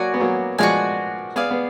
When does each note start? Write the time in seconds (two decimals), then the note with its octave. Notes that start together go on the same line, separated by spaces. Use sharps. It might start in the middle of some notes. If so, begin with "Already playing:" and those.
Already playing: F#3 A#3 F#4 D5 G#5
0.14 B3
0.20 F#3 A#3
0.59 F3 G#3 F#4 D5 G#5
1.36 B3 G#4 D5 F5
1.51 B3